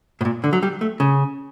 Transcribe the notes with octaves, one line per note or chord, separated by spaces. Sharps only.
A2
A#2
D3
F#3
G3
A3
C#3